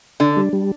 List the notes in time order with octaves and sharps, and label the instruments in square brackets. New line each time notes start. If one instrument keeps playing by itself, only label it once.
[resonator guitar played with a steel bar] D3 [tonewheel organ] D4
[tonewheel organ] G3
G3